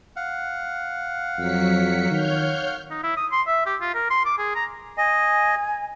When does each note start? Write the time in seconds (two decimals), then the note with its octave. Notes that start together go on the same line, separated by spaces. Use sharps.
0.16 F5 F#5
1.38 F2 F#3 B6 C#7
2.11 D#3 C#5 F6 G6
2.91 D#4
3.04 E4
3.17 D#6
3.32 C6
3.47 E5
3.66 G4
3.81 F4
3.95 A#4
4.10 C6
4.25 D6
4.38 G#4
4.55 A#5
4.98 D#5 G#5